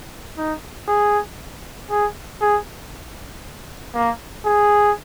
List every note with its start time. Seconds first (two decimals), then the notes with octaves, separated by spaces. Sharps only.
0.38 D#4
0.88 G#4
1.91 G#4
2.41 G#4
3.94 A#3
4.46 G#4